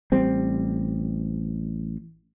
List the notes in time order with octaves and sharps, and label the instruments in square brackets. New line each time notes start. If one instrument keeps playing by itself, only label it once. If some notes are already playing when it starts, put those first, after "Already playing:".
[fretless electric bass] A1 G3 C4